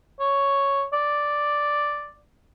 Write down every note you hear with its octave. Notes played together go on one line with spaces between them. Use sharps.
C#5
D5